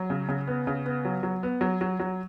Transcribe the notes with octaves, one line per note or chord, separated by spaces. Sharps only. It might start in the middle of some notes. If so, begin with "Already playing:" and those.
Already playing: F#3
C#3
C#3
B3
C#3
B3
F#3
F#3
B3
F#3
F#3
F#3